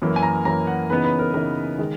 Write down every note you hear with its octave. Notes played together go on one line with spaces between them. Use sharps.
F#2 E3 A#3
G#5
A#5
F#2 E3 A#3 A#5
F#5
C#3 E3 B3 D#4 B4
B4
A#4
C#3 E3 B3 D#4 A#4
D#3 G#3